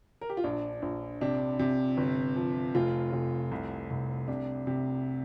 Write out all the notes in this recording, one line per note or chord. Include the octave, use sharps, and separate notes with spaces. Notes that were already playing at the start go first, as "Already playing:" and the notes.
A#4
G4
F4
A#1 D4
A#1
C3 D4
C3
G1
F3
F1 F4
F1
C2
C2
C3 D4
C3